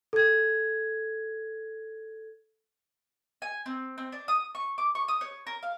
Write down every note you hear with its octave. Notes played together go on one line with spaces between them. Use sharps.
A4 G#6
G#5
C4
C4
D4
D#6
C#6
D6
C#6
D#6
C#5
A#4
F5